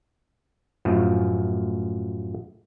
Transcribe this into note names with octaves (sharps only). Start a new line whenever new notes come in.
F#2 A2 F3